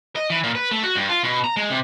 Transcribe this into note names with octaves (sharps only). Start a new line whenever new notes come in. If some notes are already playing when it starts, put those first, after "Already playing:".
D#5
E3
A#2
B4
A3
F#4
G2
F4
B2
A#5
G#3
C3